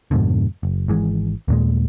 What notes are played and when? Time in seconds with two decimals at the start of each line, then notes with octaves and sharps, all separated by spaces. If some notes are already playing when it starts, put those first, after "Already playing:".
0.11 F2 G#2 B2 D3
0.63 F#1
0.88 G#1 E3 G#3
1.48 D#2 A#2 G#3